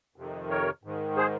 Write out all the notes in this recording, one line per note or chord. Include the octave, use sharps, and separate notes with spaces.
F2 C3 D#3
A#4 C#5
G#2 D#3
G#4 C5